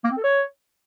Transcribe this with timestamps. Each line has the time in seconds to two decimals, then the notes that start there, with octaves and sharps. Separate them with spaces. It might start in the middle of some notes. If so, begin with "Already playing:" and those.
0.04 A#3
0.11 C4
0.17 A4
0.24 C#5